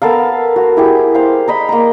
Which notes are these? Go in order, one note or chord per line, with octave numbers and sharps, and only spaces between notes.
B3 A4 A#4 F5
F#4
E4 G4 G#4
C5 F5
A#4 D#5 B5
A#3 A#5